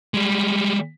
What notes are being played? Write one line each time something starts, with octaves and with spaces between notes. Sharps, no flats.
G3 G#3